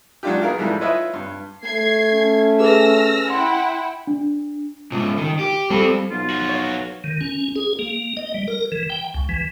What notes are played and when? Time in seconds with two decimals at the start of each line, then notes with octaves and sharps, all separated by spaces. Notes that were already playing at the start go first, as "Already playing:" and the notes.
0.23 F#3 G#3 D4 F4 G4
0.42 B3 G#4 A#4 F5
0.58 G#2 E3 F3 G3 A3
0.81 E4 F4 B4 C#5 D#5 E5
1.13 G2
1.64 A3 G#6 C7
2.12 C#4
2.60 G#4 B4 E6 F6 A#6
3.30 E4 F#5 G5 C6
4.07 D4
4.92 G#2 C#3
5.18 D#3
5.39 G4
5.70 G3 C4 A4
6.11 B1 F4
6.31 F3 F#4
6.49 C#5
7.04 D#3
7.21 C#4
7.56 G#4
7.79 A#3
8.17 D#5
8.34 G3
8.48 A#4
8.72 E3
8.90 G5
9.14 C#2
9.29 E3